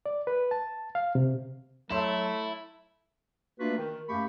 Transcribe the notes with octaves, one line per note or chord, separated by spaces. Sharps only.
D5
B4
A5
F5
C3
F#3 A3 E4 C6 E7
A3 A#3 D4 F4 F#4 B4
D#3
F#2 A3 A#3 G4 B5 C#6